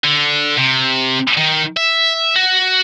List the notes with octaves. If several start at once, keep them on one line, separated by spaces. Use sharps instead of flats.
D3
C3
D#3
E5
F#4